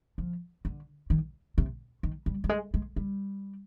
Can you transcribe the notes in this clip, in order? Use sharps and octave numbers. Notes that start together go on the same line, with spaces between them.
F3
D3
D#3
C3
D#3
G3
G3
G#3
G#3
G3